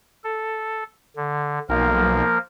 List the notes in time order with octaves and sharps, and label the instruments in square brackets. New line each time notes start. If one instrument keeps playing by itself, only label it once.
[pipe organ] A4
D3
[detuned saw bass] B1 [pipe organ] F3 A#3 A#4